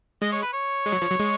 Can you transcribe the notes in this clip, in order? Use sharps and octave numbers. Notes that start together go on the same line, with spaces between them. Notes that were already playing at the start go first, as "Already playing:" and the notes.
G#3 D#5
C#5
B4
C#5
G#3
F#3
F3
F#3
G#3